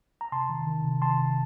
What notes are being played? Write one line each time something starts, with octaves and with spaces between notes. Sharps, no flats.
A#5
C3 A5 C6
D#3
D#3
C3
D#3 A5 C6
C3